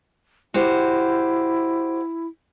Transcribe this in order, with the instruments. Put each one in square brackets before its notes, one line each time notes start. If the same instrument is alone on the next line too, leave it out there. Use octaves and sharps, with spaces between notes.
[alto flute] E4 [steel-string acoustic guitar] F#4 G4 C5